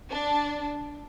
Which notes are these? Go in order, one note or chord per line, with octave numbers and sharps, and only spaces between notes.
D4